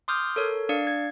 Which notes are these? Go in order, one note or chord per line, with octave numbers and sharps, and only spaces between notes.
C6 D6 D#6 F6 G6
A4 A#4 C#5
D4 D5 F5 C#7
G#6